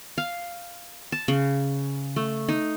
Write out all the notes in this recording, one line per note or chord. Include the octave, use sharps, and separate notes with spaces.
F5
A5
C#3
A3
D#4